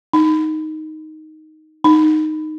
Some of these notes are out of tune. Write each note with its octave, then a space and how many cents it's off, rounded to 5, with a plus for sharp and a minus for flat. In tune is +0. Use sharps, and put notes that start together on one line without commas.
D#4 +5
D#4 -5